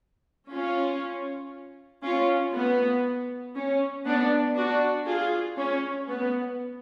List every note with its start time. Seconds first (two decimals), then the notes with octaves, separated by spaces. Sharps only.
0.51 C#4 F4
2.03 C#4 F4
2.54 B3
3.55 C#4
4.05 B3 D4
4.55 D4 F#4
5.06 F4 G#4
5.57 C#4
6.08 B3